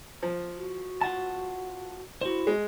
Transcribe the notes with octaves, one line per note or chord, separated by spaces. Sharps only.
F3
F#4
F4 F#5 A5
E4 F#4 C5
G#3